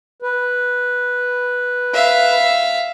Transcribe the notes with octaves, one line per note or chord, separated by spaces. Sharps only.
B4
E5 F5